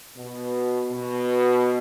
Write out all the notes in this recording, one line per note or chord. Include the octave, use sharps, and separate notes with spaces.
B2
B2